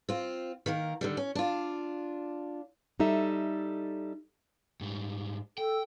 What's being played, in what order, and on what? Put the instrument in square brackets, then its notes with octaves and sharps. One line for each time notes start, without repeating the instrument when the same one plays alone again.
[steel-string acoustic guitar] C4 F4
D#3 A#3 A#4
D3 D#3 G3
C#4
D4 F4
G3 D#4 A4 E5
[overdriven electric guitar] G#2 G3
[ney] A4 [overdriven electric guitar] G5